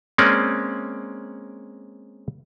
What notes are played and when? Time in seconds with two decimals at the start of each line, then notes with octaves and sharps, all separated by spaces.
0.18 G#3 A#3 C4 C#4 D5